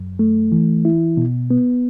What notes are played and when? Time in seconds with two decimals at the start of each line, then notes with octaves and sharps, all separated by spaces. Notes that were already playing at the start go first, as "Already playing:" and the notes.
Already playing: F#2
0.19 A3
0.52 E3
0.85 E4
1.17 B2
1.50 B3